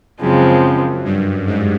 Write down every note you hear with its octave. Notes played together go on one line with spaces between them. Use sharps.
F#2 C#3 F3 G#3 C4
G2
G#2